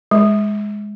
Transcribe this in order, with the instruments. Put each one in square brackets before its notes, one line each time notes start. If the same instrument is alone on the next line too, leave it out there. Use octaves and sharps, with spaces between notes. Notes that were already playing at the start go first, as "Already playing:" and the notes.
[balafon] G#3